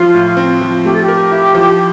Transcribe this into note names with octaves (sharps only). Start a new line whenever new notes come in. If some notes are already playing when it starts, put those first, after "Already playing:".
Already playing: F3 F4
A2
C4
F3
A3 G4
A4
G4
A#4
E4
F3